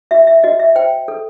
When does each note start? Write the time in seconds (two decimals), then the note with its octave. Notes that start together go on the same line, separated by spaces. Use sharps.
0.11 F#4 E5
0.27 E5
0.44 F#4 D#5
0.59 E5
0.76 C5 G5
1.08 A4